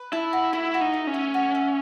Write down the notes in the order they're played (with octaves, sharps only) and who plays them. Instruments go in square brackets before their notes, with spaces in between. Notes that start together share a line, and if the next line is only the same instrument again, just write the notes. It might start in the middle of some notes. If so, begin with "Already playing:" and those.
Already playing: [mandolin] B4
[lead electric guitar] E4 [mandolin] A5
[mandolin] F#4
[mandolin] A3 [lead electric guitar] E4
[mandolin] F#4
[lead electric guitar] D#4
[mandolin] A3
[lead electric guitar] C#4
[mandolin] A3
F#4
A3